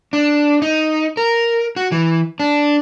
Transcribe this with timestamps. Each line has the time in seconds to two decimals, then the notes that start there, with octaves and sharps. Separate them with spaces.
0.13 D4
0.62 D#4
1.17 A#4
1.76 F#4
1.92 E3
2.40 D4